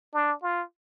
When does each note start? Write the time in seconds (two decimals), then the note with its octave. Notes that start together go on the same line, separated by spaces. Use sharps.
0.14 D4
0.42 F4